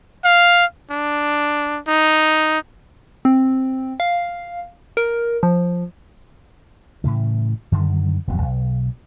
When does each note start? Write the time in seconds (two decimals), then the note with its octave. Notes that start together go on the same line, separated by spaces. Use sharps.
0.24 F5
0.91 D4
1.87 D#4
3.25 C4
4.00 F5
4.97 A#4
5.43 F3
7.04 A2 C#3 E3
7.72 F#2 D3 D#3 G3
8.27 D#1 F2 B2 F#3
8.42 B1